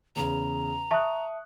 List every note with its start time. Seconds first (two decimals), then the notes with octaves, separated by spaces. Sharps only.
0.16 E2 C#3 A#5
0.91 E5 A5 C#6 D#6 F#6